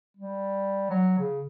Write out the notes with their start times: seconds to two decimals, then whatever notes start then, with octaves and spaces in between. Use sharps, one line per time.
0.17 G3
0.90 F#3
1.19 C#3